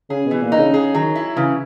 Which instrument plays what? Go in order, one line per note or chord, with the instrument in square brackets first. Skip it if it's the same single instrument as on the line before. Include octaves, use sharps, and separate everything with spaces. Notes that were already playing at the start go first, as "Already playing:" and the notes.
[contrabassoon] C#3 [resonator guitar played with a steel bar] G#4
[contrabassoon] B2
[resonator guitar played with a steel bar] E3
[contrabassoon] A#2
[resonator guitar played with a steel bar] D#4
[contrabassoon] C#3
[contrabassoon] C#3 [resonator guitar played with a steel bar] G#4
[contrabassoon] D#3 [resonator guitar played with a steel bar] F#3
[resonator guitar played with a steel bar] E4
[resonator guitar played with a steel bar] C#3 [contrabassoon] E3